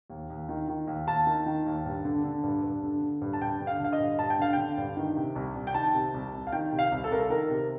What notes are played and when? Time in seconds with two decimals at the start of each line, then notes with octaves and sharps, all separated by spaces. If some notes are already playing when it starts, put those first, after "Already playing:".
0.10 D#2
0.30 D#2
0.49 D#3
0.68 D#3
0.87 D#2
1.07 D#2 A5
1.26 D#3
1.46 D#3
1.66 D#2
1.85 G2
2.05 D3
2.24 D3
2.43 G2
2.64 G2
2.83 D3
3.02 D3
3.21 G2
3.33 A5
3.41 G2 G5
3.60 D3
3.67 F5
3.80 D3 F5
3.93 D#5
3.99 G2
4.19 G2 A5
4.30 G5
4.39 D3 F5
4.53 D3 G5
4.77 G2
4.97 D#3
5.16 C3
5.35 C2
5.56 C2
5.67 G5
5.74 D#3 A5
5.95 C3
6.14 C2
6.33 C2
6.47 F5
6.52 D#3 G5
6.72 C3
6.79 F5
6.92 C2
7.04 A4
7.11 C2 A#4
7.20 A4
7.30 D#3 A#4
7.50 C3